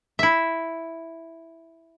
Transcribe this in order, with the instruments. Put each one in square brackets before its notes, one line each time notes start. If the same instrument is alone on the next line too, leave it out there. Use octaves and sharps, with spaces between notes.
[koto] E4 E5